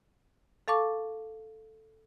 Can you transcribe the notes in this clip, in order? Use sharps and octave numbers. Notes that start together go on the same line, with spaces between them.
A4 F5 A5 C#6 D6